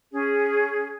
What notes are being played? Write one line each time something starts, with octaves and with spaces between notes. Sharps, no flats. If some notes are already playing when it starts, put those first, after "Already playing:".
C#4 G#4